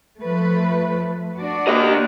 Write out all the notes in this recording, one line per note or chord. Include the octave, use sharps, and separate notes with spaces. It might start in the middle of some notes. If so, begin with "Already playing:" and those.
F3 A3 B4
D4 F#4 D5
A#3 D#5